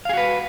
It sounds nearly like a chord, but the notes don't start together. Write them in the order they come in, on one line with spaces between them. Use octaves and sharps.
F5 G#4 F#4 B4